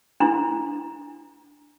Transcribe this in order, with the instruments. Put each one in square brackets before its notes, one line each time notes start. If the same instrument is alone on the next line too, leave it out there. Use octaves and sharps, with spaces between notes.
[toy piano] D4 E4